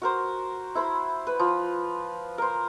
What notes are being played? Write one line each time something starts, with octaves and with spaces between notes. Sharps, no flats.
F#4 A#4 C5
E4 C5 B5
B4
F3
A#4 C5